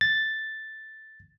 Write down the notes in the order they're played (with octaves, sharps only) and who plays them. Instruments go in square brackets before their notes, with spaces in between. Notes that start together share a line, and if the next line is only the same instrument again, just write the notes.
[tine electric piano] A6